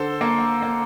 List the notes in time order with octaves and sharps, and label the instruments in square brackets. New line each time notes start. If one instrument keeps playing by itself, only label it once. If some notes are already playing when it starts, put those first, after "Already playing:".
Already playing: [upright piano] D3 A4 C5
A#3
A#3